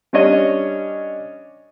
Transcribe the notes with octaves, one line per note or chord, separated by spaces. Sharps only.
G3 C#4 D4 C#5 D#5